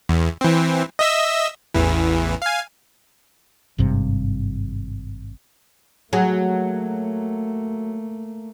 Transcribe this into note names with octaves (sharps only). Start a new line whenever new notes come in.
E2
E3 C4
D#5 E5 E6
A1 E2 E3
F5 G#5
G#1 G2 C3
F#3 A3 A#3 G#4